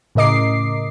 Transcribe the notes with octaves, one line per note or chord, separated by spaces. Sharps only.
A2 C#3 A#4 D#5 D6 C7